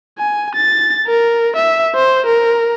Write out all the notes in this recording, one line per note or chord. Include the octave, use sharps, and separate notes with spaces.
G#5
A6
A#4
E5
C5
A#4